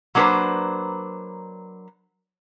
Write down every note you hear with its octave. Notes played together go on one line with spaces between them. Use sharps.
F#3 A#3 D4 A4 B4 C5